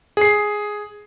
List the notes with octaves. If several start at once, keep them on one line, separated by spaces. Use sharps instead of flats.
G#4 C7